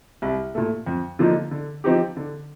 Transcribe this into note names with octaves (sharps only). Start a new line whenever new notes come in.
C2
A#2 A3
F2
D3 F3 A#3 D#4
D3
F3 C4 D#4 G4
D3